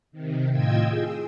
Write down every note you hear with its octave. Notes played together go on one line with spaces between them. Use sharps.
C3 D#3
A2 F4 D#5 G5 E6 G#6
G#4